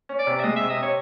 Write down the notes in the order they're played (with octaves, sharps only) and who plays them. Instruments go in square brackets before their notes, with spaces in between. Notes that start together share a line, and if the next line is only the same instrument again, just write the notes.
[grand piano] C#4
[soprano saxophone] D5
[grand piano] C3
[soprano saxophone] E5
[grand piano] G#3 [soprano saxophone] D#5
[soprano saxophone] E5
[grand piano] C3
[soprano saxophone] D#5
[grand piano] C3
[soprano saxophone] C#5